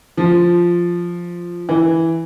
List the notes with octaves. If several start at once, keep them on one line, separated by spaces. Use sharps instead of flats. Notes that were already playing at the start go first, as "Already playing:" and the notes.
F3
E3